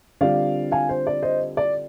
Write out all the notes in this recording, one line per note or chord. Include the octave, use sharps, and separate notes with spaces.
D3 G3 C4 F4 D5 F5
F5 G#5
C5
D5
C5 D#5
D5